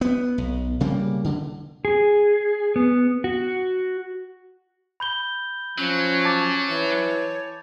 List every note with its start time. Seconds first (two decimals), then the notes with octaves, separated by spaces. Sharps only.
0.01 B3
0.38 B1
0.80 C#3 G3 A#3
1.25 D3
1.85 G#4
2.76 B3
3.24 F#4
5.00 B5 G6 G7
5.78 F3 F#3 C#4
6.25 A5 D6 A6
6.70 E3 C#5